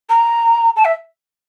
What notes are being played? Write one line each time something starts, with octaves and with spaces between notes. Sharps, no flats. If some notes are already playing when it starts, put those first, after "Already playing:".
A#5
A5
E5